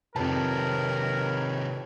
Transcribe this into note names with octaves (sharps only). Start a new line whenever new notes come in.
F2 C3 D#3 G4 A#4 B4 C#5 A5